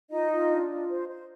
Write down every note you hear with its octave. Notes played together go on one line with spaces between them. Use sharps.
D#4 F4 D#5
F4
D4
F4
C5
C5